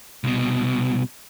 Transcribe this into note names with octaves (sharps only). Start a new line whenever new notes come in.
C2 B2